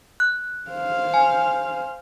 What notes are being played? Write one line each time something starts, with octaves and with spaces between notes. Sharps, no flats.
F#6
C5 F5
G#5